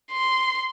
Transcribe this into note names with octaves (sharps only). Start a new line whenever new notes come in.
C6